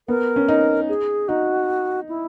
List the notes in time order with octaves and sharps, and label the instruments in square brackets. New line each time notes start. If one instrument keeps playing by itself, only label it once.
[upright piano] B3 [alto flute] A#4
[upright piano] C#4
D#4
[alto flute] G#4
[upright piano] D#4 [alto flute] F#4
[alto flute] E4